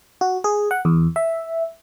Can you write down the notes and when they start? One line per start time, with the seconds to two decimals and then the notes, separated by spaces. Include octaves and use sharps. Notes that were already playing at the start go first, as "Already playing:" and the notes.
0.21 F#4
0.44 G#4
0.71 F#5
0.85 E2
1.16 E5